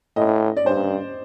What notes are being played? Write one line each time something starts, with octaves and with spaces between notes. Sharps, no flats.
A2 D#5
D5
G2 C5